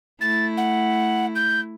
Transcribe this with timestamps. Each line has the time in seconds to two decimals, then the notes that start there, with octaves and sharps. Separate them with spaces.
0.21 A3 E4 A6
0.57 F#5
1.35 G6